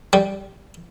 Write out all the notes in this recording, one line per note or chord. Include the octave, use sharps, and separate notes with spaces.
G3